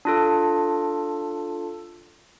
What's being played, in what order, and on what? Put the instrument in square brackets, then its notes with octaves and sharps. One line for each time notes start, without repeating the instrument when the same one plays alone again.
[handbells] D4 F4 A4